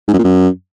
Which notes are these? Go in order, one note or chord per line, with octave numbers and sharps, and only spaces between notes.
G#2
F#2
A#2
F#2